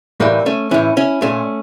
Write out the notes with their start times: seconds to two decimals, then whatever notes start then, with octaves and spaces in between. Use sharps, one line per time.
0.20 A2 E3 G3 A#3
0.46 A3 C#4
0.71 A2 E3 C#4 E4
0.97 C#4 E4
1.22 A#2 A3 C#4